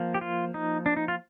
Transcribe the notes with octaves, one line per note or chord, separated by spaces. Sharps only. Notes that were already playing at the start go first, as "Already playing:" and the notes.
Already playing: F3 A#3
G4
F4
D#4
D4
D#4
F4